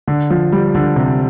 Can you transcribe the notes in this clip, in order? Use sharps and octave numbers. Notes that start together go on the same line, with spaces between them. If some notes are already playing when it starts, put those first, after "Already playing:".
D3
F3
G3
D3
C3